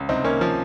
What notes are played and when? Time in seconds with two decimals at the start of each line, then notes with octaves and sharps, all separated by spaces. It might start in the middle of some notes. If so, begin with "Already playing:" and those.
Already playing: C#2
0.09 C2 C4 D#4
0.24 D#3 A#3 C#4
0.41 F3